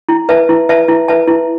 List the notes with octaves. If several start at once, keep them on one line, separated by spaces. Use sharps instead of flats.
E4
B4 E5 A5
E4
B4 E5 A5
E4
B4 E5 A5
E4